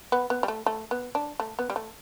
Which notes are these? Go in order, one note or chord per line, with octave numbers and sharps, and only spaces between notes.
B3
B3
G3
A3
A3
B3
D4
A3
B3
G3
A3